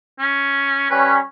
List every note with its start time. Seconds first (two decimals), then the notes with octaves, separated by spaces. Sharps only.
0.19 C#4
0.90 G3 C#4 B4